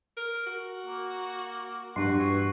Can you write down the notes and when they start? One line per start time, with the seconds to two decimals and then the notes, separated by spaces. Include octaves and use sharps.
0.17 A#4
0.47 F#4
0.87 A#3
1.96 G2 D4 F#4 C6 C#6 C7
2.19 E3